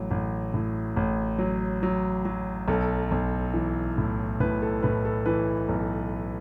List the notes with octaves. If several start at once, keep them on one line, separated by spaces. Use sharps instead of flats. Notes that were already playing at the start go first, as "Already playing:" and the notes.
Already playing: A1 F#3
A1
A2
A1
F#3
F#3
F#3
B1 A4
B1
E3
A2
A2 B4
A4
A2 B4
A4
E3 B4
B1